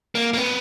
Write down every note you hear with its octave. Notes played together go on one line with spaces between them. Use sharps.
A#3
A#3
B3